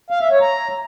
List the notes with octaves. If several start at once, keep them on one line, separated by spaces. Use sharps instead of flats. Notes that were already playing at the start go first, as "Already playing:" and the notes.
F5
E5
C#5
A#5